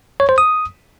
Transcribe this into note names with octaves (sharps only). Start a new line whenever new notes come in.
C#5
C5
D#6